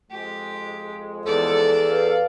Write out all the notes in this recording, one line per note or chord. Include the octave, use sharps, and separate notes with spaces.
F2 G#3 G4
E2 A4 D5
B4 F5